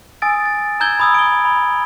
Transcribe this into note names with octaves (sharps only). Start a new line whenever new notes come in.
G#5 D#6 E6 A6 D7
A6
A#5 E6 G6 G#6 G7
B5 D#6 E6
D7 G7
B5